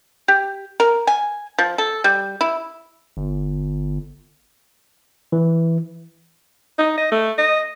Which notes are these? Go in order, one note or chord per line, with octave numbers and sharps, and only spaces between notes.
G4
A#4
G#5
F3
A4
G3
E4
G1
E3
D#4
D#5
A3
D#5